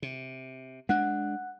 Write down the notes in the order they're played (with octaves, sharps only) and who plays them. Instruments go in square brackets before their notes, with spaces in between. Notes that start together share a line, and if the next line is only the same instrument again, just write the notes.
[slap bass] C3
[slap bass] G#3 D4 [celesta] F#5 F#6